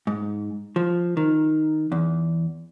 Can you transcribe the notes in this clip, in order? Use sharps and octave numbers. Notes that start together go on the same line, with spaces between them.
G#2
F3
D#3
E2